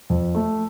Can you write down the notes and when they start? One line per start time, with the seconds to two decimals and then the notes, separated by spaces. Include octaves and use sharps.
0.10 F2
0.35 A3